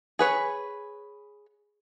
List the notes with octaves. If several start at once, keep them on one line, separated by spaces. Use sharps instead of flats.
G#4 B4 C#5